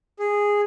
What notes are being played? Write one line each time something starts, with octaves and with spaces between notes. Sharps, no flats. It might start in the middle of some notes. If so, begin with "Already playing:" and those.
G#4